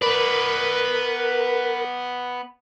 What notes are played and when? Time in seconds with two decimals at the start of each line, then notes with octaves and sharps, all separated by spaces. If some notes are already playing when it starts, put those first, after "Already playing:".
0.02 B3 A#4 B4 D5 B5